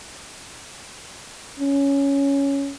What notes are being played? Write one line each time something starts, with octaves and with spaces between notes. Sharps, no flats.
C#4